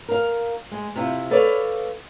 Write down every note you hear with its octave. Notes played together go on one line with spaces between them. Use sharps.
A#4 F5
G#3
C3 E4 F4
A4 B4 C#5 D5 F5